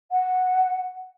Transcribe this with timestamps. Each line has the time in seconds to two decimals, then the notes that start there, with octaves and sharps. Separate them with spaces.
0.11 F#5